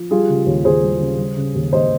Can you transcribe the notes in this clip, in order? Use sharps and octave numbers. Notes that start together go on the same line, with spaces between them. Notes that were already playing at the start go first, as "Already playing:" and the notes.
Already playing: F3
G3 F4 G#4
C#3
D#2
D#2 G#4 C5
G3
C#3
G3
C#3
D#2
D#2 C5 D#5